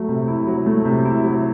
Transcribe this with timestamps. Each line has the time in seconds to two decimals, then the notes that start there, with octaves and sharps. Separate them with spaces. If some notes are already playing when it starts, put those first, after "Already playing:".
Already playing: F#3 A3
0.08 C3
0.28 E4
0.47 F#3
0.66 A3
0.85 C3
1.05 E4
1.24 F#3